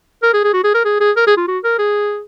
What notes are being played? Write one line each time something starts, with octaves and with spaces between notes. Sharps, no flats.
A#4
G#4
G#4
F#4
G#4
A#4
G#4
G#4
A#4
G#4
F4
F#4
A#4
G#4